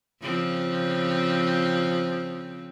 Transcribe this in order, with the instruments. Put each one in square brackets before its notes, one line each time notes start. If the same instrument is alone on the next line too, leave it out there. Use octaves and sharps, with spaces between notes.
[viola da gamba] C#3 F3 C4